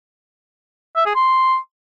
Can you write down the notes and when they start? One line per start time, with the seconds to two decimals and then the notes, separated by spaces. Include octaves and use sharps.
0.96 E5
1.06 G#4
1.15 C6